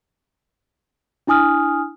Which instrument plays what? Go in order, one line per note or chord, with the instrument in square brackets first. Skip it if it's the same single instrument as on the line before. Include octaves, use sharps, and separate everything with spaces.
[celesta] D4 E4 G#5 D#6 F6